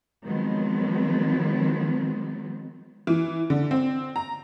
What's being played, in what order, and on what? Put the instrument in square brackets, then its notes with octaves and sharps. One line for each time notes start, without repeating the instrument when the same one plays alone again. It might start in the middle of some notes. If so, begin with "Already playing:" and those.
[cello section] D#3 F3 F#3 G#3 B3 C4
[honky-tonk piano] E3
D3
C4
A#5